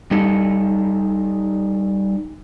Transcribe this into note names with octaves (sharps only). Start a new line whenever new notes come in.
G3 D#4 A4